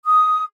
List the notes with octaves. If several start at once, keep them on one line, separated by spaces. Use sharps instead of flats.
D#6